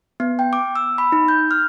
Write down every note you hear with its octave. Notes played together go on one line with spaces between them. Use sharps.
B3
G5
D6
E6
B5
D#4
G6
F6